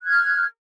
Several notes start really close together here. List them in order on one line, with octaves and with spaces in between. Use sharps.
F#6 G#6 F6